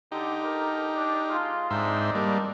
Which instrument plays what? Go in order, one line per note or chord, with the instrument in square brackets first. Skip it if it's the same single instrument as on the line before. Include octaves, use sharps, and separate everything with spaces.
[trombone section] D3 [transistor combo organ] D#4 G4
[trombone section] D3 A4 A#4
D4
G#3 F4
[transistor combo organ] G#2 C5 E5 [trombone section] C4 D4 D#4
[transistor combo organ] G3 A#3